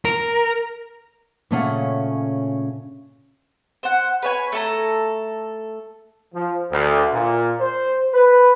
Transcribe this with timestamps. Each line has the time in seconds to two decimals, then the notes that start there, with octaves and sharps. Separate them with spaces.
0.05 A#4
1.51 A#2 C#3 A3 C#4 F5 F#5
3.83 C5 F#5
4.23 B4 C#5 G#5
4.52 A3 A4 A#5
6.35 F3
6.70 D2
7.13 A#2
7.60 C5
8.14 B4